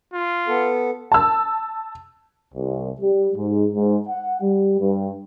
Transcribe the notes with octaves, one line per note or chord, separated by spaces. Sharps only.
F4
B3 A4
A5 E6
C2
G3
G#2
G#2
F#5
G3
G2